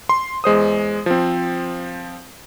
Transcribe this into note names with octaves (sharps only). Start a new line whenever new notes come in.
C6
E2 G#3 C5 D#6
F3 C4